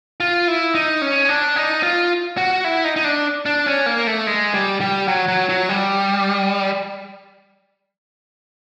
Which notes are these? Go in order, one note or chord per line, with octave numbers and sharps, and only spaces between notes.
F4
E4
D#4
C#4
D4
D#4
F4
F#4
E4
D#4
D#4
D4
D4
C#4
A#3
A3
G#3
G3
G3
F#3
F#3
F#3
G3